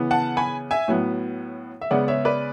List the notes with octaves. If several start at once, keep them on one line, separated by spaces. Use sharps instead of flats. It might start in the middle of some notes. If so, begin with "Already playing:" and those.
Already playing: C#3 E3 B3
F#5 A5
G#5 B5
E5 G#5
A2 F#3 B3
E5
C#3 G#3 B3 D5 F#5
C#5 E5
B4 D5